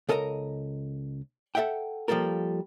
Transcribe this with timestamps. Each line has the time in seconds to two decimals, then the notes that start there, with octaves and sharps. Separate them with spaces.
0.09 C#2 A4 A#4 D#5 A5 A#5
1.55 A4 A#4 E5 F#5 G5
2.08 F3 G3 A#3 A4 A#4